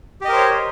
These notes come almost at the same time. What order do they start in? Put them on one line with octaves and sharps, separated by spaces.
G4 D#5 A#4 C5 C#5